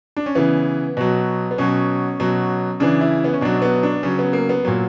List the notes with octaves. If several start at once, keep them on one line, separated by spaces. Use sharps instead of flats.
D4
C#4
C#3 E3 B3
B2 F#3
B3
B2 F#3 C#4
B2 F#3
C#3 E3 D4
E4
B3
C#4
B2 F#3 D4
B3
D4
C#3 F#3 C#4
B3
A#3
B3
A#2 F#3